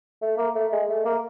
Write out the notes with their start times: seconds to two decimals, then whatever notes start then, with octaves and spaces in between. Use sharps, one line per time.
0.22 A3
0.38 A#3
0.55 A3
0.72 G#3
0.89 A3
1.05 A#3